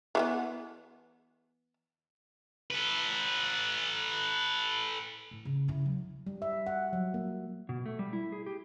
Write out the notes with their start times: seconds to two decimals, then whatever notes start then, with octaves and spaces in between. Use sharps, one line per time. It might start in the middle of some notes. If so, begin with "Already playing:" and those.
0.15 E3 A3 B3
2.70 A4 B4
5.31 A2
5.45 C#3
5.68 C#3 E4
5.86 F#3
6.27 G3
6.42 E5
6.67 F#5
6.93 F#3
7.14 A#3
7.69 B2
7.86 A3
7.99 G3
8.13 E4
8.32 G#4
8.46 G4